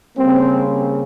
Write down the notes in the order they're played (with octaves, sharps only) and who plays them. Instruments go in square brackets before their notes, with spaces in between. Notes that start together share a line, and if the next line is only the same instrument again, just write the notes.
[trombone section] C#3 G3 A#3 C4